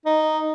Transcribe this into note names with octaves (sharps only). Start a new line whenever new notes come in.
D#4